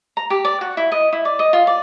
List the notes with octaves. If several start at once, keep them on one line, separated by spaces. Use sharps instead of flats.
A#5
G4
D5
F#4
E4
D#5
E4
D5
D#5
F4
D5